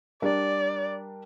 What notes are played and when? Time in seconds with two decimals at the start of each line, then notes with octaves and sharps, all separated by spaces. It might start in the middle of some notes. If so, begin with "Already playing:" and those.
0.22 G3 D4 A#4 D5